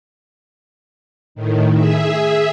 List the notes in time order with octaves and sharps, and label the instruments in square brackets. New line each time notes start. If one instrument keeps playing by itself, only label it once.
[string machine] A2 D#3
G#4 E5